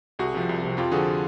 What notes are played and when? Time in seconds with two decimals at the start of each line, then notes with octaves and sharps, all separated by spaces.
0.19 C2 F#4 G#4
0.34 C3 F3
0.49 C2
0.63 C3 F3
0.77 F2 F4 G4
0.91 D3 F3 F#4 G#4